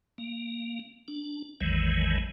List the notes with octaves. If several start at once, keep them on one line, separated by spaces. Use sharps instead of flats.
A#3
D4
A1 E2 D#3 E3 F#3 G#3